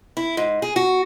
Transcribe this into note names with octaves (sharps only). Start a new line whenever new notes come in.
E4
G#2
G#4
F#4